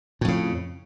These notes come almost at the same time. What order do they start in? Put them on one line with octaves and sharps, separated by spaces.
A2 F2 C#3